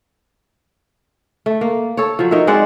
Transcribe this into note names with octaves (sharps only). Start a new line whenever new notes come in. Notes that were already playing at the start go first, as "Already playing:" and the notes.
A3
A#3
A4 C#5
F3 F#3
D#4 A#4 C#5 E5
G#3 C4 D5 F#5